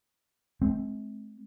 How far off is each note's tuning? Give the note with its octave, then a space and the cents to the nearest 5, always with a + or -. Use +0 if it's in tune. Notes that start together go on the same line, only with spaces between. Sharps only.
G#3 +45 C4 +10